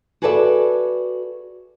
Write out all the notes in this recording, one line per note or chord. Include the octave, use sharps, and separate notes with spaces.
F#4 G#4 A4 B4 D5 E5